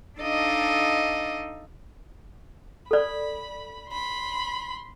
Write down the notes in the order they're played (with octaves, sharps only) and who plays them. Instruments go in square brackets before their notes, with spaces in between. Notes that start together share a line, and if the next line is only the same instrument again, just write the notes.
[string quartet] D4 D#4 A4 D#5 F5
[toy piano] A4 D5 [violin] B5
[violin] B5 C6